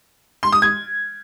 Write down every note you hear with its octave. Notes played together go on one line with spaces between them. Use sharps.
C6
D#6
G#6